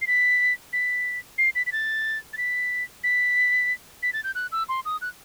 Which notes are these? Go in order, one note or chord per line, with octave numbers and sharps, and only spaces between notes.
C7
B6
B6
C7
B6
B6
A6
A6
B6
B6
B6
A6
G6
F#6
E6
C6
D#6
F#6